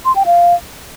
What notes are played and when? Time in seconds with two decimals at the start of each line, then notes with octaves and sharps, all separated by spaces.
0.05 C6
0.16 G5
0.26 F5